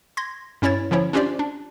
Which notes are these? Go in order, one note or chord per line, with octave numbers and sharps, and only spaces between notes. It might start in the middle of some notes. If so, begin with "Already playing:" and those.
C6 G#6 A#6
G2 C#4 E4 C#5 A6
D3 F3 C#4 E4 C#5
C#4 D4 F4 G4 C5 D5
D4